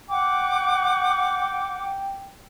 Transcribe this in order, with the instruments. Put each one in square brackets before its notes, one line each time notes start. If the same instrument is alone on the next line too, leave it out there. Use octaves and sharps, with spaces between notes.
[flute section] F#5 D6 [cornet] G5